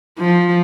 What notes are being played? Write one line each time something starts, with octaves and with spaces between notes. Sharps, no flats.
F3